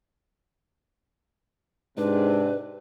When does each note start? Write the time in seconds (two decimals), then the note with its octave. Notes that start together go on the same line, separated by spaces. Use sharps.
1.97 G#2 C3 D4 B4